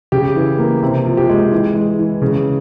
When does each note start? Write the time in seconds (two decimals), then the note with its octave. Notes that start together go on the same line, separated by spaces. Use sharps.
0.12 C#3 G4
0.36 E3
0.58 A#3
0.83 C3
1.05 F3
1.17 G4
1.29 G#3
1.52 E3
1.75 G#3
1.99 E3
2.22 C#3